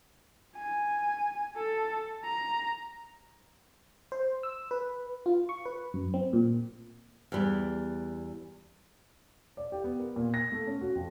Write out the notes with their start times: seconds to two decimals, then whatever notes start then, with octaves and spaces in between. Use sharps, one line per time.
0.56 G#5
1.57 A4
2.24 A#5
4.12 C5
4.43 E6
4.71 B4
5.26 F4
5.49 C#6
5.66 B4
5.94 F#2
6.14 C4
6.33 A#2
7.32 E2 G3
9.57 D5
9.72 G4
9.84 B3
9.99 A#4
10.16 A#2
10.34 A#6
10.52 A3
10.67 C#4
10.81 F#4
10.95 F2